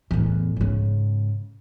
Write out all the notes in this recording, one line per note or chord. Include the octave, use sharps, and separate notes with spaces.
E2 A2
G#2 C#3